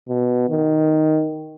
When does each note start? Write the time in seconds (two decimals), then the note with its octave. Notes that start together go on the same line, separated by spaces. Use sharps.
0.09 B2
0.50 D#3